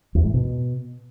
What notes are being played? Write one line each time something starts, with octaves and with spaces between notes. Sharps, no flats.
E2
G#2
B2